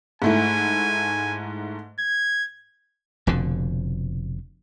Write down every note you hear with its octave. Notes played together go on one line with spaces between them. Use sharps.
G#2 A3 E4 G#5
G#6
F1 F2 B2 D3